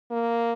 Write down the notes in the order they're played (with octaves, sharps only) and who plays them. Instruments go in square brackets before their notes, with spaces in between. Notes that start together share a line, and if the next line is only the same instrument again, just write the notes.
[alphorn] A#3